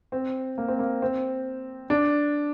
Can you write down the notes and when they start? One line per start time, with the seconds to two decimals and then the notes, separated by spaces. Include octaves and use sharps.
0.12 C4
0.58 A#3
0.68 C4
0.79 A#3
1.02 C4
1.90 D4